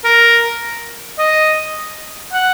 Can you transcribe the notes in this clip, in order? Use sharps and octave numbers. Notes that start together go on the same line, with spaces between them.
A#4
D#5
F#5